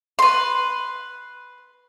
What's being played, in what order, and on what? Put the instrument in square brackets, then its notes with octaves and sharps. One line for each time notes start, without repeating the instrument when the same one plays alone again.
[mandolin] B4 C6